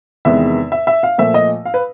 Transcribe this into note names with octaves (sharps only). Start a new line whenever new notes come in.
E2 C3 D#3 G#3 B3 E5
E5
E5
F5
A#2 F3 A3 E5
D#5
F5
B4